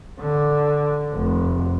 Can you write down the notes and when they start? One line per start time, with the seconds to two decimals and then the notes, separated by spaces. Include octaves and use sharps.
0.19 D3
1.13 F1